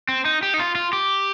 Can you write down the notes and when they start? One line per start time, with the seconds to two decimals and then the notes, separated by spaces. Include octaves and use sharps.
0.09 C4
0.25 D#4
0.43 G4
0.54 D#4
0.59 F4
0.75 F4
0.93 G4